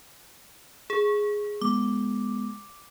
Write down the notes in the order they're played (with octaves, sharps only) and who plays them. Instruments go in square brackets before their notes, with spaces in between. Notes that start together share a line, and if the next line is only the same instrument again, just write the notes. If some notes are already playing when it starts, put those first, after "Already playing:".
[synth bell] G#4
[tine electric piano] G#3 B3 [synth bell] D6